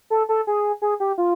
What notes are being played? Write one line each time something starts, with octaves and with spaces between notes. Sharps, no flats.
A4
A4
G#4
G#4
G4
F4